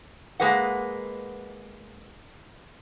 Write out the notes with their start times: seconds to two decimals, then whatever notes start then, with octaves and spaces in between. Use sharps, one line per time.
0.40 G#3 A#3 B4 D#5 F#5